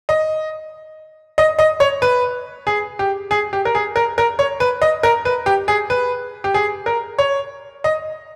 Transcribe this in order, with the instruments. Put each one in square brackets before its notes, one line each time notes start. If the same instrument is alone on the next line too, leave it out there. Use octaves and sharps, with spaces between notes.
[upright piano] D#5
D#5
D#5
C#5
B4
G#4
G4
G#4
G4
A#4
G#4
A#4
A#4
C#5
B4
D#5
A#4
B4
G4
G#4
B4
G4
G#4
A#4
C#5
D#5